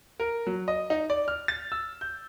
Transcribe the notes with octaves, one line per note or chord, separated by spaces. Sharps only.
A#4
F#3
D#5
D#4
D5
F6
A6
E6
G6